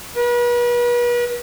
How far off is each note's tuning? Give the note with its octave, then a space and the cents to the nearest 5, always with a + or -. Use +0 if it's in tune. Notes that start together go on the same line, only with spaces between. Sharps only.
B4 -40